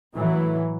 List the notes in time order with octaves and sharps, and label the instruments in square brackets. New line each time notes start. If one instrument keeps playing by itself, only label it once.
[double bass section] A2 E3 F#3